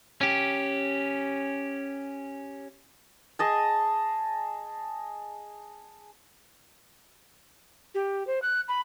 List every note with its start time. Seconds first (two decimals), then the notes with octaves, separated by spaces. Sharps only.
0.21 C#4 G4
3.39 G#4 D#5 A5
7.95 G4
8.27 C5
8.42 F#6
8.68 B5